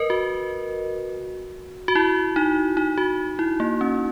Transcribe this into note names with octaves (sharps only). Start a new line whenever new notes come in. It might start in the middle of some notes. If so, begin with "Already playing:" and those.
Already playing: A#4 B4 D#5
F#4
F#4
E4
D#4
D#4
F#4
E4
A#3
C#4